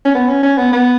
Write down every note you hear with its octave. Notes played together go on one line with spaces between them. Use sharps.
C#4
B3
C#4
C#4
B3
B3